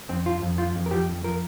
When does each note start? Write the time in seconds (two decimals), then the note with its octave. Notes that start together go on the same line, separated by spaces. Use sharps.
0.09 F2 C4
0.26 F3 F4
0.42 F2
0.58 F3 F4
0.75 F2
0.86 A#4
0.91 F3 G4
1.08 F2
1.24 F3 A#4